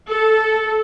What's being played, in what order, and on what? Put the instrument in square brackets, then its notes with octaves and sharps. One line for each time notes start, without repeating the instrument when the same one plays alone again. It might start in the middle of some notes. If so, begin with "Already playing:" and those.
[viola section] A4